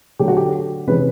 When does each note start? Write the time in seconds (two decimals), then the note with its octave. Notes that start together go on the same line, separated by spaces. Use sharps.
0.19 D3 F#3 A3 G4
0.28 F#4
0.37 G4
0.87 C3 E3 G#3 C#4 B4